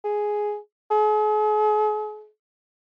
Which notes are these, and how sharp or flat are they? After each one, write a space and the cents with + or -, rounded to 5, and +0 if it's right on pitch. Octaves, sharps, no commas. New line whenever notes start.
G#4 +5
G#4 +40